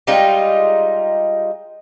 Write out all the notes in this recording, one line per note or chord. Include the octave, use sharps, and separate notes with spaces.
G3 G#3 D#4 F4